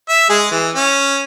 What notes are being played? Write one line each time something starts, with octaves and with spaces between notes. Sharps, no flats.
E5
G#3 G#4
E3
C#4